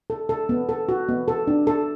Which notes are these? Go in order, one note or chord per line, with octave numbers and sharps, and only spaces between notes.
A4
A4
B3
A4
F#4
B3
A4
D4
A4